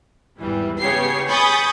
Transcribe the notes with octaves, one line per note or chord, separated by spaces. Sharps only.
G#1 E2 E3 G3
C#3 B3 G4 C#5 C7
G#5 B5 C#6 D#6 G6 A6